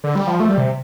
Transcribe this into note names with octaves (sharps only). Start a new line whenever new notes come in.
D3
G3
F3
A3
G3
C3